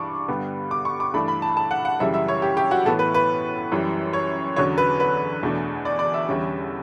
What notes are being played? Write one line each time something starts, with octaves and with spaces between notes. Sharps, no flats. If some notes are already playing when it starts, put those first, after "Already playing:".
Already playing: G2 E3 G3 D4 C#6 D6
G2 D3 G3 B3
D6
C#6
D6
G2 E3 A3 D4 B5
B5
A5
A5
F#5
F#5
F#2 C#3 E3 G3 E5
E5
C#5
G4
G4
F#4
A2 E3 B3 A4
B4
B4
F#2 E3 G3
C#5
E2 D3 F#3 C#4 C#5
B4
B4
E2 B2 A3 D4
D5
D5
E5
E2 D3 G3 C#4